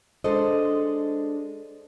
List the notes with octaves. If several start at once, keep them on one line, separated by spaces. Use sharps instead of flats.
G#3 D4 A4 C5 D#5